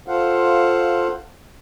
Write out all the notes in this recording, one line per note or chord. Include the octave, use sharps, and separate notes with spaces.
F4 A4 C5 F5 F#5